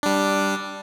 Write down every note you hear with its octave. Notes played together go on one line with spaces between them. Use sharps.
G3 D4